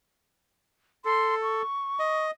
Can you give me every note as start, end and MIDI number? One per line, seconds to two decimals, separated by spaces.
1.05 1.62 69
1.05 1.35 84
1.43 2.26 85
1.99 2.31 75